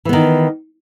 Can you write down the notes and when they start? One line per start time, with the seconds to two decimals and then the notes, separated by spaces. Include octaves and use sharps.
0.05 E3
0.09 B3
0.13 D#3